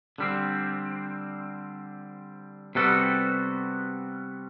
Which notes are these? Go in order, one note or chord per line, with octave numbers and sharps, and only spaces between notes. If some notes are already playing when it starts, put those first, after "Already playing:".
D3 G3 C4
C3 G3 B3 F#4 A4